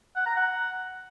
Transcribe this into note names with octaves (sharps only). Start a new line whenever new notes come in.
F#5
A#5
F#5